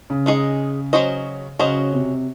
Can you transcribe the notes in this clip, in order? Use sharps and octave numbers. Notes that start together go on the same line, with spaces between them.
C#3
G#3 D#4 G#4 D#5
F#3 C#4 F#4 C5 D#5
C#3 F#3 C#4 F#4 C5 D#5
C3